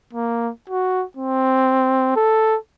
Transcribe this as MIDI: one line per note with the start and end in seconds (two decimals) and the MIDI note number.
0.13 0.51 58
0.69 1.04 66
1.17 2.12 60
2.16 2.57 69